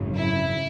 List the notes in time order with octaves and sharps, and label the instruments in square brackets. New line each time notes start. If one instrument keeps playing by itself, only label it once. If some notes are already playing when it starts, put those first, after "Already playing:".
Already playing: [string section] G#1 F#2 C#3
[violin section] E4